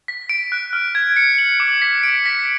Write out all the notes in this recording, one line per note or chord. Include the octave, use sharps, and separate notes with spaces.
B6
D7
F#6
F6
G#6
C#7
F#7
D6
B6
D7
B6